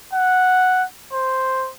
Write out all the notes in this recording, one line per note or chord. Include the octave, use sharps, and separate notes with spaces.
F#5
C5